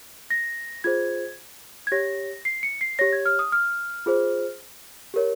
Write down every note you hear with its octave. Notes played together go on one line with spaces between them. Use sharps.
A#6
F4 G#4 C5 G#6
G#6
G4 C#5 A#6
C7
C#7
C7
G4 C#5 A#6
G#6
F6
D#6
F6
F4 G#4 C5
G4 A#4 C#5